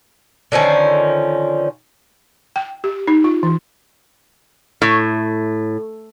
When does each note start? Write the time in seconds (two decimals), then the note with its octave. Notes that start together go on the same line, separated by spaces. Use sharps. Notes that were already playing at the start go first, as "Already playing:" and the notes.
0.52 D3 D#3 F3 C#4
2.56 G5
2.84 G4
3.08 D#4
3.24 F4
3.43 E3
4.82 A2